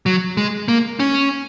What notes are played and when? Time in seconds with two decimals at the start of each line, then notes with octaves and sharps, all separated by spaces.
0.06 F#3
0.37 G#3
0.68 A#3
1.00 C#4